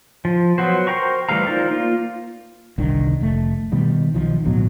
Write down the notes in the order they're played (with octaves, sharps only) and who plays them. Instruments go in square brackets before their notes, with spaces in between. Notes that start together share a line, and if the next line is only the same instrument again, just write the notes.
[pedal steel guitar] F3
F#3 B3 F#4 C5
A#4 C5 G5 A#5 C#6
E3 G3 A3 F5 A#5
D#4 F4 A#4 C5 D5
A#3 F4
[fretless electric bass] G1 C2 D3 D#3
F1 A3
B2 D#3 G3
B1 D#3 F3
D1 A1 B2 F#3